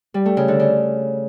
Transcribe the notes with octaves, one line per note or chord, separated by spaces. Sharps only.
G3
A3
C#3
D3
C#3